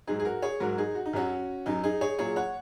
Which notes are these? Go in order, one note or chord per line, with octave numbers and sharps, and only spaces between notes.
G#2 F#3 D#4 G#4
G#4
F#4 A#4
G#4 C#5
G#2 F#3 F#4 A#4
D#4 G#4
F#4
D#4
F#2 F#3 C#4 F#4
F#2 F#3 D#4
D#4 G#4
G#4 C#5
A#2 F#3 G#4 C#5
C#5 F#5